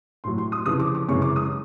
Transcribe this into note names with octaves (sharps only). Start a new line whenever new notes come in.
A2 F#3 C6
C6
D#6
F2 C#3 E3 D#6
D6
D6
F#2 C#3 E3 G#3 C#6
D6
D#6